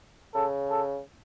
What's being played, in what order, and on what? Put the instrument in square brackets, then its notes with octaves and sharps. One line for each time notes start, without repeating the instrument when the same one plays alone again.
[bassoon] C#3 [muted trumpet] A4
[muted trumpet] A4